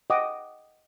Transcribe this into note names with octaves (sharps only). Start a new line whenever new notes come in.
D#5 F#5 G5 D6 D#6